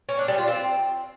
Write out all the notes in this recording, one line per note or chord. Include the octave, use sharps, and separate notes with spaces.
C#4
D4
G3
F4
C4